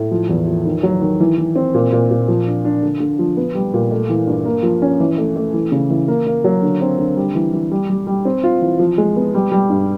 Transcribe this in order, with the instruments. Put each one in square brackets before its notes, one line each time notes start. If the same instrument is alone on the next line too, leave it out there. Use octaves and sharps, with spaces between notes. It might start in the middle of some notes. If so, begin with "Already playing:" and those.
Already playing: [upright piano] A2
F3
E2
F3
D#3
F#3
D#3
E3
E3
C4
A#2
A#2
A#2
F3
D4
D4
D3
D3
F3
B3
G3
A#2
A3
E3
G2
A#3
F3
C#4
E3
A3
A3
E3
C#3
E3
A#3
A#3
F#3
D3
C4
D3
G3
E3
E3
G3
G3
G3
C4
F4
E3
F3
G#3
B3
G3
G3
G2